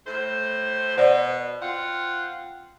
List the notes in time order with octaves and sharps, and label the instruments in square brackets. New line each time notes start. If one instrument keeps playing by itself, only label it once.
[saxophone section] A2 A3 C5
[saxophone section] B2 [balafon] C5 D5
[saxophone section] C4 F4 F#5